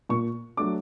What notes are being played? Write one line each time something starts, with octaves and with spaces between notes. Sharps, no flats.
A#2 C#6
F#3 A3 D4 D6